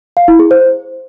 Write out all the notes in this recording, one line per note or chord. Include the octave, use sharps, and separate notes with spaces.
F5
E4
G#4
C5